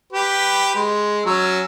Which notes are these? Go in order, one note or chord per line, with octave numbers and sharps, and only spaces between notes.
G4 B4
G#3
F#3 C#4 E6